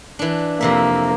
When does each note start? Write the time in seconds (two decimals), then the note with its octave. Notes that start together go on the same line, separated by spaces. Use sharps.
0.19 E3 D4
0.61 F2 C3 A#3 E5